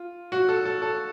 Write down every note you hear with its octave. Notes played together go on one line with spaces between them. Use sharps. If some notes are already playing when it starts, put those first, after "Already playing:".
Already playing: F4
F#4
A4
A4
A4